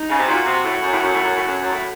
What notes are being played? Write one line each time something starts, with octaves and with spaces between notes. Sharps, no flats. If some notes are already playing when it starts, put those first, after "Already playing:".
Already playing: D#4
C#3
C3
A#2 F#4
C3
A2
F#2
A2
F#2
A2
F#2
A2
F#2
F#2
A2